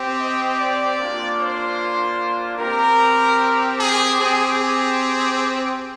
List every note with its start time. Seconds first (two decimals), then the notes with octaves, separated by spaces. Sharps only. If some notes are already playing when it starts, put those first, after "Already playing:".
Already playing: C4 G4
0.19 D#5
0.59 D5
0.99 A#3 D4 F4
1.39 C5
2.59 C4 G4 A#4
3.78 G#4
4.18 C4 G4 G#4
4.59 G#4